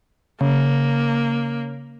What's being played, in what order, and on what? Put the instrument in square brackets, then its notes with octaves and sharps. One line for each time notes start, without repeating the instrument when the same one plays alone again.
[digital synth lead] C#3 [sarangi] A#3